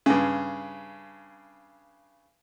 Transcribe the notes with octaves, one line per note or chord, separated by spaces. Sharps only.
G2 C#3